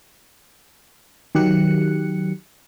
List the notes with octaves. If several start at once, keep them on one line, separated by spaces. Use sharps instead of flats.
D#3 F#3 G4 F#6 C#7